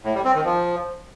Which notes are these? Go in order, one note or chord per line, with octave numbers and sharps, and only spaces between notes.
A2
G3
C4
D#3
F3